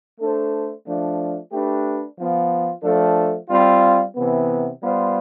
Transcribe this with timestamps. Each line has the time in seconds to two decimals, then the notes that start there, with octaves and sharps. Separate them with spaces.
0.19 A3 D4 A4 C5
0.85 F3 A3 D4
1.51 A3 D4 G4 B4
2.17 F3 B3 F4
2.83 F3 A3 D4 A4
3.49 G3 C4 F4
4.16 C3 E3 B3
4.82 G3 B3 F4 C5